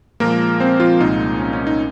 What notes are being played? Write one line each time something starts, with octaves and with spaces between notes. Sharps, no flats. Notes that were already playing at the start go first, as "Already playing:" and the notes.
A#2 F3 G#3 A#3 A#4
C4 C5
F3 F4
C2 A#2 G#3 D#4
C#4
C#4
D#4